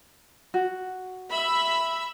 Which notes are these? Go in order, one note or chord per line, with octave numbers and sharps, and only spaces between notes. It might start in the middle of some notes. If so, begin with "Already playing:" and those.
F#4
E5 B5